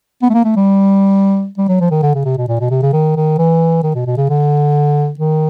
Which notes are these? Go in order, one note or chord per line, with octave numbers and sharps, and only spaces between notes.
B3
A3
A#3
A3
G3
G3
F#3
F3
D#3
D3
C#3
C3
B2
A#2
B2
C3
C#3
D#3
D#3
E3
D#3
B2
B2
C#3
D3
D#3